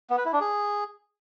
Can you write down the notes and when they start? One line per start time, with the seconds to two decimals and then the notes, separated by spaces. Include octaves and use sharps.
0.10 B3
0.18 B4
0.25 E4
0.33 D4
0.41 G#4